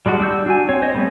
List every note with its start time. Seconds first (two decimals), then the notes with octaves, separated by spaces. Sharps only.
0.06 G3 G#3 D4 F#4
0.19 G3 D4 E6 G6
0.46 D4 F#4 G#5
0.69 C4 C#5
0.82 C5 C#5 D#5
0.95 G3 A3 B3